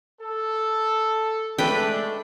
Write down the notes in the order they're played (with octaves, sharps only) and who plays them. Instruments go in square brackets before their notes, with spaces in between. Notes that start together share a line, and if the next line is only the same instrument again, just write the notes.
[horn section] A4
[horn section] G#3 A3 D4 [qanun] A4 B4 G5